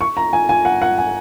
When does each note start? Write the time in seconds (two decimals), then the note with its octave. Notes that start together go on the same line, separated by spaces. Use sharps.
0.01 C#6
0.17 A#5
0.33 G#5
0.49 G#5
0.65 F#5
0.82 F#5
0.98 G#5